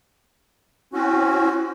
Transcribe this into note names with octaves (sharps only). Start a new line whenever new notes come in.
C4 C#4 E4 F#4